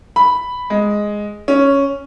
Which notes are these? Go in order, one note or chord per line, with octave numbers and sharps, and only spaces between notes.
B5
G#3
C#4